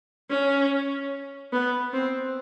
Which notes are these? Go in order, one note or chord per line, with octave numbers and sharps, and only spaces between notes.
C#4
B3
C4